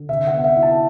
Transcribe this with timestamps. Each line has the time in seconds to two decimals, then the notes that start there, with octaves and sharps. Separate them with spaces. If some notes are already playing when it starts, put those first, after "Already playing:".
Already playing: D3
0.09 C3 E5
0.27 F#5
0.33 B3
0.44 E5
0.57 E4
0.63 A5